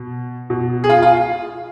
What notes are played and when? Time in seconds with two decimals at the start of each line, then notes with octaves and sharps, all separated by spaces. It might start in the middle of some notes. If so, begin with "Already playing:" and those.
Already playing: B2
0.50 B2
0.84 G#4
0.89 F4
1.02 F4